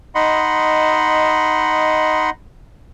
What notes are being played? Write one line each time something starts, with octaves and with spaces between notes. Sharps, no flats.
D#4 D#5 F#5 B5 C6